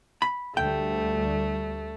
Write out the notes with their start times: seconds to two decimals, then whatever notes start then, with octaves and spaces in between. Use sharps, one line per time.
0.22 B5
0.57 D2 G3 A3 G5